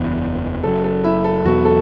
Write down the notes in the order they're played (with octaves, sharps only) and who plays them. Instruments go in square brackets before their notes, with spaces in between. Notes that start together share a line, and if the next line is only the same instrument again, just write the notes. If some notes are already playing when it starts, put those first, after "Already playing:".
Already playing: [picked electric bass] F#1 E2 E3 B3
[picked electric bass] F#1 F#2 F#3 [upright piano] A4
[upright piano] A4
E4 E5
A4
[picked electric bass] E2 B2 F#3 B3 [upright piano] F#4
[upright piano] A4